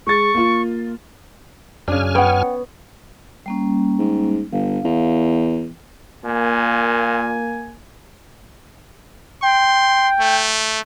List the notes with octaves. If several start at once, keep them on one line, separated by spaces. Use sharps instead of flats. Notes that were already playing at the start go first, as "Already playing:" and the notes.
G#3 C#6 A6
A#3 F4
F#2 C#3 D4 G#5 F6
B3 C#5 F#5 G5
G3 A#3 C#4
G#2
G1 F5
E2
A#2 A#3 G#5
G5 C6
A3